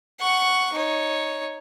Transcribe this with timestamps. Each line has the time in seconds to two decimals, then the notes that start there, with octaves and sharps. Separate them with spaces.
0.20 F#5 C#6
0.73 D#4 C#5